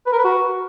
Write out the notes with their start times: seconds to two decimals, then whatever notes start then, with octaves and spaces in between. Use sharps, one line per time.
0.07 B4
0.13 A#4
0.18 B4
0.24 F#4